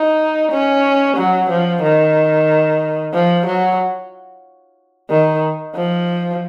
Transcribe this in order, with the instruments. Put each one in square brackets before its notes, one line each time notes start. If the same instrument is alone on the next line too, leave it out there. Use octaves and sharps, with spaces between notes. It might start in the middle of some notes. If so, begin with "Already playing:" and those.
Already playing: [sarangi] D#4
C#4
F#3
F3
D#3
F3
F#3
D#3
F3